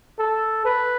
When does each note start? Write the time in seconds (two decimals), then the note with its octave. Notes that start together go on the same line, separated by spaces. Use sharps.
0.19 A4
0.65 B4